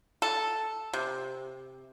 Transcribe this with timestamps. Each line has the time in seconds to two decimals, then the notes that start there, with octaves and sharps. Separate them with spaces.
0.22 A4
0.93 C3